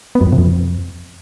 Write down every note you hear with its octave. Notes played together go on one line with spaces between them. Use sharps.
B3
F#2
F2
C3
F2